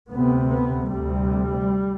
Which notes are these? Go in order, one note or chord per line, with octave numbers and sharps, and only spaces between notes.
D2 C3 B3
B3
D2 C3 G3